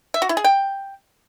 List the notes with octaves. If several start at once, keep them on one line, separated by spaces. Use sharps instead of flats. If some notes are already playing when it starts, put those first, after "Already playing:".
E5
F#4
E4
G#4
G5